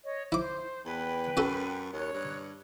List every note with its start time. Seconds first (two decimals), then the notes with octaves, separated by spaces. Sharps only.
0.04 C#5 D#5
0.32 E4 C5 D6
0.85 E2 B4 G5
1.37 F#2 C#4 F#4 A4
1.93 D#2 C#5 F#6
2.13 G2